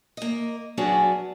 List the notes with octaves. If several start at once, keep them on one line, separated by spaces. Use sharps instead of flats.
A#3 D#5
F#3 B3 C#4 D4 F#4 G#4